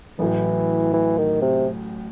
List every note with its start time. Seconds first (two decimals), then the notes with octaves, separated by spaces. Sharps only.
0.19 A1 A2 E3 F#3
0.94 E3
1.18 D#3
1.42 C3